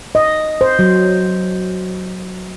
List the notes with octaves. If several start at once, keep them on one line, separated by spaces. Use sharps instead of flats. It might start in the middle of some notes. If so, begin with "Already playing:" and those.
D#5
C5
F#3